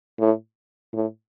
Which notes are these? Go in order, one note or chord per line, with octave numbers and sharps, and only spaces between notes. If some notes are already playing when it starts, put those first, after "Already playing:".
A2
A2